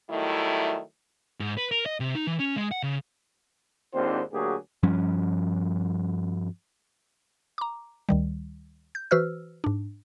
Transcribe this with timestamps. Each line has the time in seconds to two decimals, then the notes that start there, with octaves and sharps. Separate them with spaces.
0.10 D#3 F#3 G3 A3 E4
1.40 G#2
1.57 B4
1.71 A#4
1.86 D#5
2.00 C3
2.15 D#4
2.27 E3
2.39 C#4
2.56 G#3
2.71 F#5
2.83 C#3
3.94 D#2 G#2 C4 D4 F4 C5
4.33 D2 F#3 A#3 G4 G#4
4.83 G2 F3 G3 C#4
7.58 A#5 D6
8.09 D2 D#3 G3
8.95 G6
9.11 E3 F#4 B4 C5 E6 F6
9.64 G#2 D4